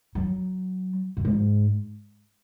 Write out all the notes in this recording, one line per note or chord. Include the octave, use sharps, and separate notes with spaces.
F#3
F#2
G#2